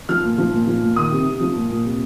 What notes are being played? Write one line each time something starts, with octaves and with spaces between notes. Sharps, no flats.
F3 F6
A#2
F3
A#2
F3
A#2
D#3 D#6
C3
C3
F3
A#2
A#2
C3